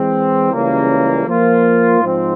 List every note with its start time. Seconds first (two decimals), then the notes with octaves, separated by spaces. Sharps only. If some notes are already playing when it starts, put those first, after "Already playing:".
Already playing: E3 G#3 C4
0.52 C#2 C#3 E3 G3 A#3
1.27 F3 A#3 F4
2.01 G#2 F3 C4